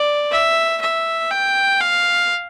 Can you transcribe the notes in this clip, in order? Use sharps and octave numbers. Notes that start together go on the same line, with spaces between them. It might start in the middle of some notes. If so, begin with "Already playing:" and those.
Already playing: D5
E5
E5
G5
F5